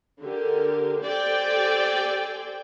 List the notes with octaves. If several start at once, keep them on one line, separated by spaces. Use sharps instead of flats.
D3 G4 A#4
G4 A4 C5 D5 G5 G#5